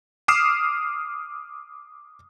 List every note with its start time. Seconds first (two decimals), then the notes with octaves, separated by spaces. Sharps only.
0.28 D6 D#6 F6 C7 E7